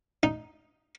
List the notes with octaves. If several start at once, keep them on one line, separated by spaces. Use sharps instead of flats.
D#4